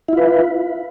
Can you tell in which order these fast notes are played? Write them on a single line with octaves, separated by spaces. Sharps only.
E4 F4 B4